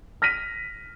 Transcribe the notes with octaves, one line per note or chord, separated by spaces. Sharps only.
F6 A#6 B6 D#7